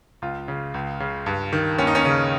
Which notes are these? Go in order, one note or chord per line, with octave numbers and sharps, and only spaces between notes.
C#2 F4
C#3
C#2
C#3
G2
D#3
D#2 C#4
D#4
C#4
C#3